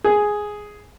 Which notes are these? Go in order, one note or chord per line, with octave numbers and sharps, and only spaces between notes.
G#4